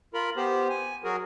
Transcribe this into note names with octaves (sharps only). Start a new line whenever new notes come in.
F4 A#4 B5
B3 G4 C5
G#5
F#3 F#4 G#4 A#4